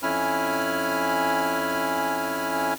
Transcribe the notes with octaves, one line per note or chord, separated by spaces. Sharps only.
F2 C#4 E4 G#5 B5 F6